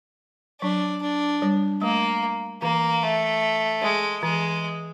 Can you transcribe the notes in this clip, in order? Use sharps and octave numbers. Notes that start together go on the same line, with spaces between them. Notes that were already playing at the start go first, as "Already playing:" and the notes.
F#3 D4
D4
G3
A3 A#3
E3 A#3
A3
G#3
E3 G#3